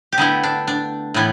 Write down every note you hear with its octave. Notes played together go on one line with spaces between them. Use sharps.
G4
D3 A3 B3 E4
D4
D4
A2 E3 B3